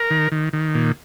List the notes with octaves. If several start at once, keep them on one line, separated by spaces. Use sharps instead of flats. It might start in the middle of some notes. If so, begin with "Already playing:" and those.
Already playing: A#4
D#3
D#3
D#3
A#2